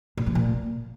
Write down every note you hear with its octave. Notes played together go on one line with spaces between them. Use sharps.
A#2
F3
A#2